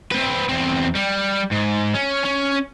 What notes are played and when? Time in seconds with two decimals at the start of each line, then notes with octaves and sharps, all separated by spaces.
0.12 C4 B4
0.49 E2 C4
0.96 G3
1.52 G#2
1.94 C#4
2.24 C#4